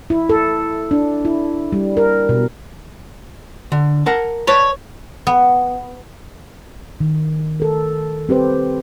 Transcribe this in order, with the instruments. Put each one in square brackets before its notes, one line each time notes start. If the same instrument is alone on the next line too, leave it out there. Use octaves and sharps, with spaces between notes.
[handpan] E4
A4
D4
E4
G3
A#4
B2
[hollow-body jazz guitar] D3
A#4 F#5 A5
[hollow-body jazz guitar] B4 D5 A5 [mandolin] C#5
[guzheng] B3
[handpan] D#3
A4 A#4
C4 G4 B4 C5